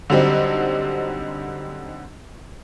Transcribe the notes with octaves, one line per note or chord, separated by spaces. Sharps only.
D3 F#3 G3 C4 D#4